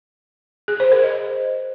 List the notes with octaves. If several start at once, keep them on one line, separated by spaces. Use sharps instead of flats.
G#4
C5
A#4
D#5